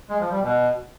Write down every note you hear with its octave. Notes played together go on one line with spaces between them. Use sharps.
G#3
F3
G3
B2